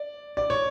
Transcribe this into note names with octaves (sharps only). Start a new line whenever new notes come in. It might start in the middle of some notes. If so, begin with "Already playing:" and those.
Already playing: D5
D5
C#5